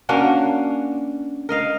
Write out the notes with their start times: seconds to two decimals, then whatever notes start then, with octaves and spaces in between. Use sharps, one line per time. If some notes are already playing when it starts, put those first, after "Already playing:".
0.09 A#3 C#4 D4 F#4
1.49 A#4 D#5 F5